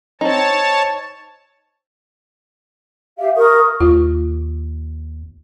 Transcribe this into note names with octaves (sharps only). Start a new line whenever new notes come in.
C4 D#4 C#5 A5
G4 E5 F5
A#4 C#6 D#6
D#2 F4